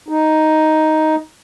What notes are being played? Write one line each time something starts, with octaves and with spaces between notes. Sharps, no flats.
D#4